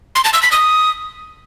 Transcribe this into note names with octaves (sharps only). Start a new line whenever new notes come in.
C6
A5
E6
B6
D#6